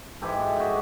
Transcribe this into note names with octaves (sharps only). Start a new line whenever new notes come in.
G#2 E3 G#3 G4 A4
F#4 G#4